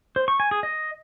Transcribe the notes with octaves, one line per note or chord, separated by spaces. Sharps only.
C5
C#6
G#5
G#4
D#5